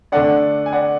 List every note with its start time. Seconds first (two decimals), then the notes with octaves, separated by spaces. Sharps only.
0.12 D3 A3 D4 D5 F#5
0.66 G#5
0.73 D5 F#5